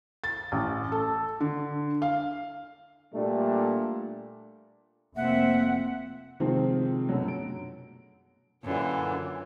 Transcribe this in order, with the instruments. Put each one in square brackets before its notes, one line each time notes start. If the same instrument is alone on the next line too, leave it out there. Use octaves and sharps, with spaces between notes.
[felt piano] A6
A1
A4
D3
F5
[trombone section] A#2 G3 A3 D4
[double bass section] F1 F3 C4 [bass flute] A#3 [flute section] E5 [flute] F#5
[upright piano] C3 D#3 F3 G#3 C4
F#2 B2 D3 F#3
D7
[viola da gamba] F#2 [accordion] A#2 D3 E3